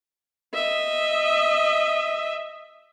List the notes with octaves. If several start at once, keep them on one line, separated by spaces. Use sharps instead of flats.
D#5 E5